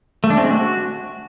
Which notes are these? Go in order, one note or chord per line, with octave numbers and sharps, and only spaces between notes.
A3
D4
C4
G#3
F#4